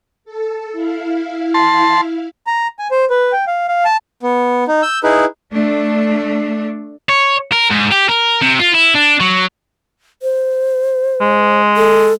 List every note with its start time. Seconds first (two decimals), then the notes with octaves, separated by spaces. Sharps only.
0.25 A4
0.72 E4 F5
1.54 A5 C6
2.47 A#5
2.79 G#5
2.91 C5
3.10 B4
3.32 G5
3.47 F5
3.68 F5
3.85 A5
4.23 B3
4.68 D#4
4.83 E6 G6
5.03 D#4 E4 G#4 B4
5.53 A3 D4
7.09 C#5
7.52 A#4
7.70 G#2
7.92 G4
8.09 A#4
8.41 C3
8.59 F4
8.74 E4
8.95 D4
9.21 F#3
10.22 C5
11.21 G#3
11.76 A4